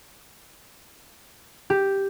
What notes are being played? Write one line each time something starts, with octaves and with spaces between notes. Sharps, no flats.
G4